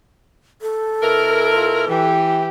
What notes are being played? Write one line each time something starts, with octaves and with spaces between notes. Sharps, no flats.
A4
B2 E4 A#4
F4
E3 G4